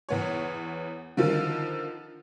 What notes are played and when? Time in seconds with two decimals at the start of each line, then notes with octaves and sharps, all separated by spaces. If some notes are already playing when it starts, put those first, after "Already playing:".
0.09 E2 B3 C#5
1.17 D3 D#3 F3 F4